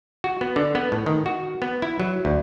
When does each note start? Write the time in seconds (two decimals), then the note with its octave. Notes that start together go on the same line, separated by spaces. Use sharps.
0.24 F#4
0.41 B3
0.56 D3
0.75 B3
0.92 A2
1.06 D#3
1.26 F#4
1.62 B3
1.82 E4
2.00 F#3
2.25 D2